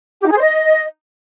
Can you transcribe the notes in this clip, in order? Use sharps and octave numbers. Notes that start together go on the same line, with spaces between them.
G4
D#4
G#4
C5
D#5